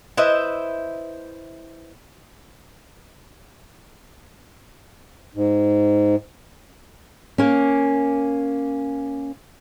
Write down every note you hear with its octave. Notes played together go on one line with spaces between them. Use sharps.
E4 B4 C5 D#5 E5
G#2
A#3 C#4